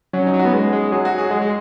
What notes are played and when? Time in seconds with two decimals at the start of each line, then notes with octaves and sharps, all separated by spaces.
0.13 F#3 C#4
0.27 D#4
0.34 F#3
0.39 F#4
0.45 B3
0.53 G#3
0.73 G#3
0.92 F#3 G#4
1.05 F#4
1.18 G#4
1.31 G#3 G#4
1.41 G#3